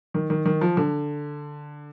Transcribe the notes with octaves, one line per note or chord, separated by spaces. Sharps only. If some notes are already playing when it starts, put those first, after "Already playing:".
D#3
D#3
D#3
F3
D3